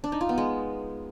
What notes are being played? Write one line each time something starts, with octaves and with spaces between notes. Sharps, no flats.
D4
D#4
F4
B3
G#3